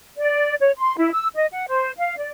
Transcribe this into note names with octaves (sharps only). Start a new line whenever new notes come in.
D5
C#5
C6
E4
E6
D#5
F#5
C5
F5
D5